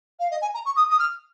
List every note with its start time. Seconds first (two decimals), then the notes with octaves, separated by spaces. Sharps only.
0.19 F5
0.31 D#5
0.41 G#5
0.54 A#5
0.65 C#6
0.76 D#6
0.90 D#6
0.99 F6